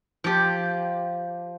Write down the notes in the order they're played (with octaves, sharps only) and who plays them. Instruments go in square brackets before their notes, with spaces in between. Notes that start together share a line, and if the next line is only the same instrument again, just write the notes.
[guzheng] F3 G4